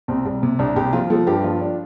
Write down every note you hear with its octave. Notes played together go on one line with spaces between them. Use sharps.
C2 C4
C2 G3
C3
C2 D4
C2 G4
F3 F4
F3 A4
G2 G4
F3 F4
D4